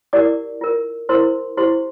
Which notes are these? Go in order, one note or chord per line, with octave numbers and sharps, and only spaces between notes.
E4 G4 A#4 D5 D6
F4 A#4
E4 A#4 C5 C6
E4 G4 C5 C6